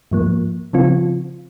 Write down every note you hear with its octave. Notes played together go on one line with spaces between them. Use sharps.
G#2 F3 A#3
C#3 F3 C4 F4